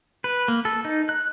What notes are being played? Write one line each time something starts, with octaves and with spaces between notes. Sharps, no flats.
B4
A#3
A4
D#4
F#6